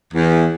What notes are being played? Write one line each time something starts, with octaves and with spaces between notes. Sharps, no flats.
E2